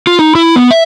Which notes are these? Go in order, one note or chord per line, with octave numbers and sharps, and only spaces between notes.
F4
D#4
E4
B3
E5